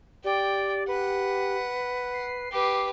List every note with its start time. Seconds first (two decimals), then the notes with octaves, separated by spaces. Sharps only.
0.24 G4 D5 G5
0.88 B4 F#5
2.13 C7
2.52 G4 B4 D6